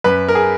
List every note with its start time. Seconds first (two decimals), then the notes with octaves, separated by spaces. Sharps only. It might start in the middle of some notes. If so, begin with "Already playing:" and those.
0.04 F#2 B4
0.28 A#4
0.35 G#4